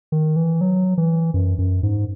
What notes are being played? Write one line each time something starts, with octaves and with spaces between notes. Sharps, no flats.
D#3
E3
F#3
E3
F#2
F#2
G#2